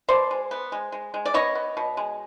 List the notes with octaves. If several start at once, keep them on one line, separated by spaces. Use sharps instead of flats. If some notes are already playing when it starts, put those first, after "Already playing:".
B2 C5 D5
G#3
B3
G#3
G#3
G#3
D5
B3 C#5 D#5
B3
B2
G#3